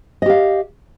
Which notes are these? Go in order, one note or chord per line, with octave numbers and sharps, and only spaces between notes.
G4 D#5 F5